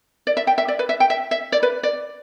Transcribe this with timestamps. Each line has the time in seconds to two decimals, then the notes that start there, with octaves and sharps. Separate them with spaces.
0.27 D5
0.37 E5
0.47 G5
0.58 E5
0.68 D5
0.79 B4
0.89 E5
1.00 G5
1.10 E5
1.31 E5
1.52 D5
1.63 B4
1.83 D5